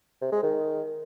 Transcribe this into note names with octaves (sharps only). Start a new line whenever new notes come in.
C3
G#3
D#3